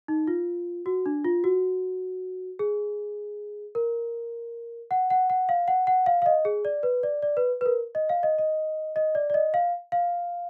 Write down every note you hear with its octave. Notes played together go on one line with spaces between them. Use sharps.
D#4
F4
F#4
D4
F4
F#4
G#4
A#4
F#5
F#5
F#5
F5
F#5
F#5
F5
F5
D#5
G#4
D5
B4
D5
D5
B4
B4
A#4
D#5
F5
D#5
D#5
D#5
D5
D5
D#5
F5
F5